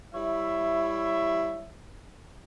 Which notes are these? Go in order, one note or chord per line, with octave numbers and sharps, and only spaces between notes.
G3 E4 C#5 E5